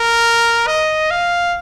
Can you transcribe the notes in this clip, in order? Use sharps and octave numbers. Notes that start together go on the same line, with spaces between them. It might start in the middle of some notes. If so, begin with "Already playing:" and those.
Already playing: A#4
D#5
F5